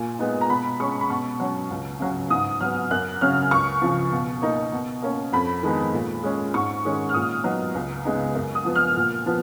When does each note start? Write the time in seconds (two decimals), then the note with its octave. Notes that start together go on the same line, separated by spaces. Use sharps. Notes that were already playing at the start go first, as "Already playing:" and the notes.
Already playing: A#2 G#5
0.19 G#3 B3 D#4
0.41 A#5
0.50 B2 B5
0.79 G#3 C#4 C#6
1.01 B5
1.09 B2 C#6
1.40 F#3 C#4
1.70 C#2
2.00 C#3 F#3 C#4
2.30 G#2 D#6
2.61 F#3 B3 F6
2.91 F#2 F#6
3.21 C#3 F#3 C#4 F6
3.51 C#2 C#6
3.82 C#3 F3
4.12 B2
4.42 A#3 D#4
4.72 B2
5.02 A#3 C#4
5.33 F2 B5
5.62 D#3 G#3 B3 D#4
5.93 A#2
6.23 G#3 C#4
6.54 G#2 C#6
6.85 D#3 G#3 C#4
7.09 F6
7.14 A#2 D#6
7.44 F#3 B3 D#4
7.74 C#2
8.05 C#3 G#3 B3 D#4
8.35 F#2
8.55 D#6
8.65 F3 B3
8.75 F6
8.96 A#2
9.26 F3 B3